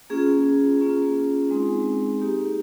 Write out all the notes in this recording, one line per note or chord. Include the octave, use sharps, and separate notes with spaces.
A#3 C#4 F4 G#4
A#3 C#4 F4
G#3 C4 D#4
A#3 D#4 G4